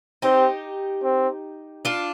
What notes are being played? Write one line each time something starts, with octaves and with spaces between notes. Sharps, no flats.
C4 D#4 G4
C4
D4 F4